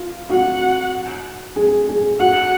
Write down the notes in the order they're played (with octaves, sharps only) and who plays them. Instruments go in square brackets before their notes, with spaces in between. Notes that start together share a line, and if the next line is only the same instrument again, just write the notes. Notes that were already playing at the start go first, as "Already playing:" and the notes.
Already playing: [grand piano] F4
[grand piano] F#4 [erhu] F#5
[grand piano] G#4
G#4
[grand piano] F#4 [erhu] F#5